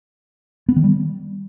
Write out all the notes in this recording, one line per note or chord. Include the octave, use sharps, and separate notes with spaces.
B3
D#3
G3